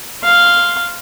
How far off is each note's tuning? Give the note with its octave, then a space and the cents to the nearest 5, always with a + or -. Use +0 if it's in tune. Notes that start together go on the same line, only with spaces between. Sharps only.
F5 +0 C6 +0